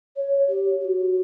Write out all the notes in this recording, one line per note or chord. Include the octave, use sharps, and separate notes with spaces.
C#5
G4
G4
F#4